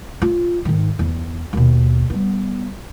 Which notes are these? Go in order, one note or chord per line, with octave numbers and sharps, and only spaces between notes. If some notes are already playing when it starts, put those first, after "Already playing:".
F4
G#2 D#3
E2
D#2 B2
G3 B3